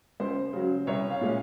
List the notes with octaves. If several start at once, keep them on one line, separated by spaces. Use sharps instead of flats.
C#2 C5
C#3 F#3
C2 C#5
F5
A#2 G#3 C#4